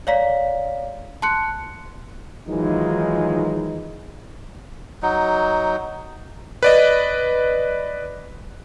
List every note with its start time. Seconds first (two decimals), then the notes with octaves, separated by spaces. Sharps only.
0.07 C#5 D5 F5 A#5 B6
1.22 A5 C6 F#6 C#7
2.48 D#3 E3 F#3 G#3 D#4 F4
5.02 F#3 D#4
6.63 B4 D5 D#5